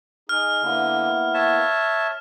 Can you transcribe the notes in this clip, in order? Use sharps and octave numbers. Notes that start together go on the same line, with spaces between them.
D#4 G#4 F6
D3 A#3 B3 E4
C#5 E5 A5